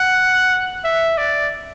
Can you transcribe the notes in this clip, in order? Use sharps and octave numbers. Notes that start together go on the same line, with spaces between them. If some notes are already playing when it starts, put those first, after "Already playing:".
Already playing: F#5
E5
D5